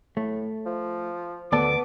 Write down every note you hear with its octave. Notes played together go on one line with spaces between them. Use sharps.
A2 A3
F3
D2 B3 A4 D5 A5 D6